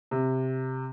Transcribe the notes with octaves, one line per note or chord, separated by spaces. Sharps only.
C3